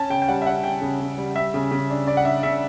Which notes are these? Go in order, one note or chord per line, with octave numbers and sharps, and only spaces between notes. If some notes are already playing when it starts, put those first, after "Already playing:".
Already playing: C#4 A5
C#3 G5
G5
G3 F#5
E5
C#4 F#5
C#3 G5
C#3
C#3
G3
G3 E5
C#3
C#3
D4
D4 D5
F#5
D4 E5
C#3 E5